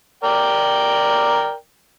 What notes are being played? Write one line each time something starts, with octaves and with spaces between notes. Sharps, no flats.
A#4 D5 G5